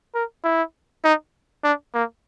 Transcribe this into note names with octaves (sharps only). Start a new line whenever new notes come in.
A#4
E4
D#4
D4
A#3